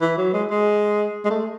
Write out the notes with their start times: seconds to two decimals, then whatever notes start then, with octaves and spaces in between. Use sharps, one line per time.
0.01 E3
0.18 F#3
0.33 G#3
0.50 G#3
1.25 G#3
1.30 A3